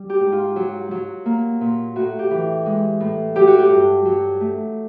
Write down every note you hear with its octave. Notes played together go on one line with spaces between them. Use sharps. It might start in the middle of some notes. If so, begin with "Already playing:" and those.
Already playing: G3
G4
G#2
F4
F#3
F#3
A#3
A#2
A2 F#4
G4
E3
G#3
A2
F#3 G4
F#4
G4
G2
F#3
A3